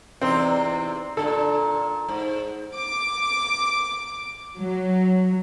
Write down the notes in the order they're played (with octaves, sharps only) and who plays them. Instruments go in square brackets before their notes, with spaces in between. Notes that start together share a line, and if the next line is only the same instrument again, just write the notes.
[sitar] E2 C3 D#4 [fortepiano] C4
[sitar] A#2 D3 [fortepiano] A4
[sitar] G#2
[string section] D6
F#3